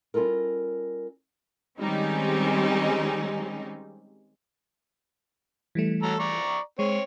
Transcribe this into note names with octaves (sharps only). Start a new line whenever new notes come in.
G3 C#4 F4 A4 A#4
D#3 G3 G#3 C4 C#4 D#4
E3 G3 A3
F#3 A4 A#5
D5 A#5 C#6
G#3 C4 C#5